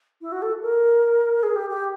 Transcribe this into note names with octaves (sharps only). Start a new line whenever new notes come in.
E4
F#4
A4
A#4
G#4
G4
G4